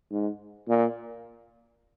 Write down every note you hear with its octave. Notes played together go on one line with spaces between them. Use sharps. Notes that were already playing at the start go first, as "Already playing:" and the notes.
G#2
A#2